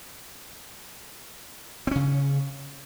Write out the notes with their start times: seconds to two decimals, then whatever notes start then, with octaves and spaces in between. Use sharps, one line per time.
1.87 C4
1.91 C#4
1.95 C#3